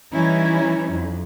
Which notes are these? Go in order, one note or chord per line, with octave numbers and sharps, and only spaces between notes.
E3 G3 C#4 D#4 E4
F2